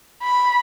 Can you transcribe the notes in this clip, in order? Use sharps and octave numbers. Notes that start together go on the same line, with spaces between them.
B5